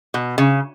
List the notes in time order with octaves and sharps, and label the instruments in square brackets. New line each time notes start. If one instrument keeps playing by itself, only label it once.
[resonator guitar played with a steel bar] B2
C#3